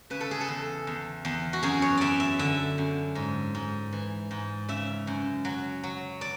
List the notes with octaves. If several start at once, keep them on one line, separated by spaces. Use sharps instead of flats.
C#3 B4
A4
G#4
A4
E2
E2
E2
F#4
F#2 G#4
C#5
F#2 D5 E5
E5
D3 E5
F#2
G#2
G#2
E3
G#2
C#3 E5
F#2
F#3
F#3
D5